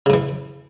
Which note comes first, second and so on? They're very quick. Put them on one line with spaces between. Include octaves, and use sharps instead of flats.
C#3 A2 E3